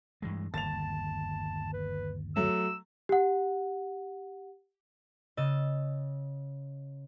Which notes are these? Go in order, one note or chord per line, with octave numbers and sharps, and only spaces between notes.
G2 E3 G#3
G1 D#2 A5 A6 F7
B4
F#3 A3 E6
G4 F#5
C#3 D#5 E6 A6